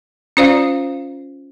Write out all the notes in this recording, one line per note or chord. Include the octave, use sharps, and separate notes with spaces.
C#4 F4 C5 D5 F5